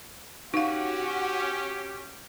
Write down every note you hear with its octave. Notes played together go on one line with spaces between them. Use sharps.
C#4 D#4 F#4 G4 F5